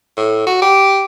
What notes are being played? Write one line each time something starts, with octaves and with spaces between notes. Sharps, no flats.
A2
F#4
G4